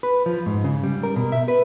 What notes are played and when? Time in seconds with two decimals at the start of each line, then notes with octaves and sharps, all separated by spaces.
0.03 B4
0.26 F3
0.46 G#2
0.64 C#3
0.84 G3
1.03 A#4
1.16 B2
1.32 E5
1.48 B4